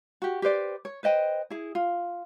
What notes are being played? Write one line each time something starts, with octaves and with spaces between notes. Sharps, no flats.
F#4 G4
G4 B4 C5 D5
C#5
B4 C5 D#5 G5
E4 G#4
F4